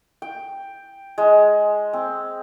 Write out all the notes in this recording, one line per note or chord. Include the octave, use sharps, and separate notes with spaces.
G5
G#3
C4